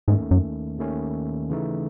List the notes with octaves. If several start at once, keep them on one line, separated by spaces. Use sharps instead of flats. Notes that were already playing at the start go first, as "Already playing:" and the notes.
D#2 G#2 D#3 A3 C#4
F#2
D#2 D#3 A3 C#4
C#3 E3 A3 D#4